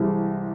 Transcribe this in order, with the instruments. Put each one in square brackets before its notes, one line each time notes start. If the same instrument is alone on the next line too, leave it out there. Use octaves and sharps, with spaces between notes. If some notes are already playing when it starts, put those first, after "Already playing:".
Already playing: [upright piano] C2 C3 E3 G#3